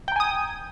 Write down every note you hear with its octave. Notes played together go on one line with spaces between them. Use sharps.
G5 G#5 A#5 D#6